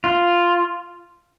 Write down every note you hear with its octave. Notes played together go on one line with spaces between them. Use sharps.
F4